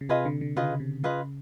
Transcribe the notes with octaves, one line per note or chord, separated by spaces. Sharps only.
C#3
C3 F4 G#4 B4 D#5
D3
D3
C#3 F4 G#4 B4 D#5
C3
C#3 F4 G#4 B4 D#5